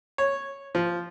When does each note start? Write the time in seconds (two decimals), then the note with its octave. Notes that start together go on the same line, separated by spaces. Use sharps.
0.18 C#5
0.75 F3